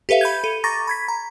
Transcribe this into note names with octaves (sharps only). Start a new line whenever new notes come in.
G4 A4 B4 E5 F5
B5 G6 G#6
A4 D#7
A#5 C#6 D6 A6 A#6
B5 G#6 B6
A#5